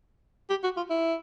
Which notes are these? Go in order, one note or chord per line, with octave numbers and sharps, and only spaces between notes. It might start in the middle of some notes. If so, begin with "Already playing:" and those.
G4
F#4
F4
E4